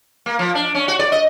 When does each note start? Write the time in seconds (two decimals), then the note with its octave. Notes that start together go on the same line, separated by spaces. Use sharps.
0.26 A#3
0.39 F3
0.55 D4
0.75 C#4
0.88 F#4
0.99 D5
1.12 D#5